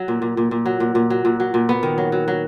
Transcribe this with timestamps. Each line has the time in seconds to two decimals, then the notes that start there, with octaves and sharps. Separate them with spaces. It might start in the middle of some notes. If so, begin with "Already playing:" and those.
Already playing: F#3
0.08 A#2
0.22 A#2
0.37 A#2
0.51 A#2
0.66 F#3
0.80 A#2
0.95 A#2
1.10 F#3
1.25 A#2
1.40 F#3
1.54 A#2
1.69 B3
1.83 D#3
1.98 F#3
2.12 F#3
2.28 F#3